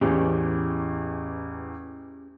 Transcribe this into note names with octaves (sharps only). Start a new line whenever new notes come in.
A1 E2 C#4 G4 G#4